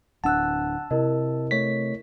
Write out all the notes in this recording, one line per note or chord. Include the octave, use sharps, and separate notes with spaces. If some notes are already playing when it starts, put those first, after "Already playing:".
D1 D4 F#5 A5 E6 F#6
C3 E4 A#4 D#5
A3 C#5 B6